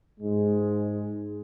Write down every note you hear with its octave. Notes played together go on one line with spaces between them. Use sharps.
G#2 G#3